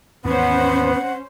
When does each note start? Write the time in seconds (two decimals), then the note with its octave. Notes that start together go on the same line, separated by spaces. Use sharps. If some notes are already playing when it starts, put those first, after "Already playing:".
0.25 D#2 G#2 E3 B3 C#4 C5 F#5